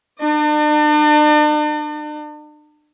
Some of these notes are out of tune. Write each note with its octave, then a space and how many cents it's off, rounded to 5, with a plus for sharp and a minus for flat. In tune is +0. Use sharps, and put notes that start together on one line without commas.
D4 +40 D5 +45